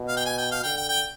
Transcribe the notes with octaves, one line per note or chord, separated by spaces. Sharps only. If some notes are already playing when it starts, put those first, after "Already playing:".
Already playing: B2
F5
G5
G#5
G5
F5
D3 G5
G5
G5